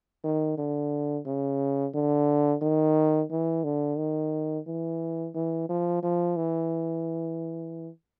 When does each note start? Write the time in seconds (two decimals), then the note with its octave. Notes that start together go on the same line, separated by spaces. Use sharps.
0.24 D#3
0.58 D3
1.26 C#3
1.95 D3
2.62 D#3
3.31 E3
3.64 D3
3.98 D#3
4.67 E3
5.35 E3
5.69 F3
6.03 F3
6.37 E3